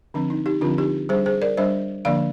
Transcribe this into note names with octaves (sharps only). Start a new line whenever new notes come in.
D3 F3 C4 D4
D#4
D#4 G4
D3 F3 C4 D4 F4
D#4 G4
G3 D4 G#4 C5
G#4 C5
A#4 D5
G3 D4 C5 D#5
D3 F3 A#3 D4 D5 F5